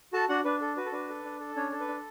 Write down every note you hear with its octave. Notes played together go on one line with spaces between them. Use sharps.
F#4 A4 A5
D4 F#4 F#5
D4 B4
A4
F#4 B4
A4
D4 B4
A4
D4
A4
C#4 D4 C#5
A4
B4
D4